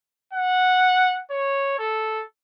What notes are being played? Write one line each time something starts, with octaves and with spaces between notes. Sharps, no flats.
F#5
C#5
A4